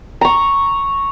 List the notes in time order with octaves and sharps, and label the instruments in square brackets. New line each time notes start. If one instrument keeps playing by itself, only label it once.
[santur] A#5 C#6